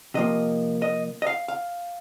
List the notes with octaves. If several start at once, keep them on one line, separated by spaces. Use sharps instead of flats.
C3 F3 A#3 D#5
D#5
D#5
F5
F5